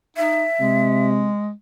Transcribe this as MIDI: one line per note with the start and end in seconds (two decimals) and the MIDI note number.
0.17 0.45 63
0.17 1.07 76
0.60 1.31 48
0.60 1.51 56